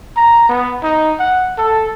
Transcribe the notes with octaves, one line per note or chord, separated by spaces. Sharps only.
A#5
B3
D#4
F#5
A4